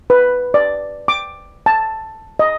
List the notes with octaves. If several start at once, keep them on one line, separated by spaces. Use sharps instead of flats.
B4
D5
D6
A5
D#5